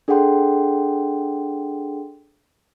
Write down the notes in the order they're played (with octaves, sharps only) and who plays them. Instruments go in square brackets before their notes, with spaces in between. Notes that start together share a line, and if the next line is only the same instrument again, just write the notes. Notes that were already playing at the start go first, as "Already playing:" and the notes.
[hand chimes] D4 G#4 A4 F#5 G5 C6